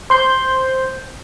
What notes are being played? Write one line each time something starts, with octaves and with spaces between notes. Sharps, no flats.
C5 C6 G6